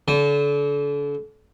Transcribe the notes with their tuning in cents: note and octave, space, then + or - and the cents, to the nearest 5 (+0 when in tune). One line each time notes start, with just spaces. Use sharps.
D3 -35 A5 -35